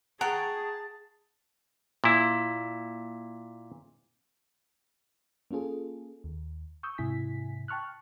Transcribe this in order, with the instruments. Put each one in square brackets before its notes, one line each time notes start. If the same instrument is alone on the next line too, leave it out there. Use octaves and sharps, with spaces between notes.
[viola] G#4 [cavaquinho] F#5 C#6 [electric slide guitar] G5 A#5 [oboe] A5
[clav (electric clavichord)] A#2 E4
[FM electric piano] A#3 C#4 F4 G#4 A4
D#2
C#6 D#6 E6 G6
G#2 C3 E4 G#5 B6
G5 A5 C#6 F6 F#6